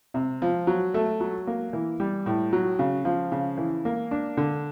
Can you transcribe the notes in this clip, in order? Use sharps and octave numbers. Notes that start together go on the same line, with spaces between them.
C3
F3
F#3
A3
F#3
A#3
E3
G3
A2
F#3
C#3
F3
C#3
E3
A#3
D4
D3